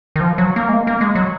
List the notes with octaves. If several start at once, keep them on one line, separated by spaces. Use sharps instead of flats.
D#3
F3
F#3
A#3
G#3
A#3
A#3
G#3
F#3